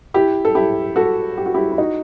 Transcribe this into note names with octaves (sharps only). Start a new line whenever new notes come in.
E4 G4
A4
E4 G4
F#4 A4
G4
F#4
E4 G4
E4
D#4 F#4